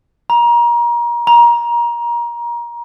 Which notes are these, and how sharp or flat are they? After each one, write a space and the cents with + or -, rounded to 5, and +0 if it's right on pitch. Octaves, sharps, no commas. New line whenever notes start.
A#5 +30
A#5 +25